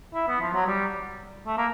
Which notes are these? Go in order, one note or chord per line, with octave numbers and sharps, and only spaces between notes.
E4
B3
F3
F#3
G3
A3
A#3